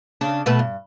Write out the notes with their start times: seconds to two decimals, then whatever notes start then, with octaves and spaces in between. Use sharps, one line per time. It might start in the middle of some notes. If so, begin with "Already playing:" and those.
0.21 C#3 D4
0.46 B2 A3 B4
0.59 G2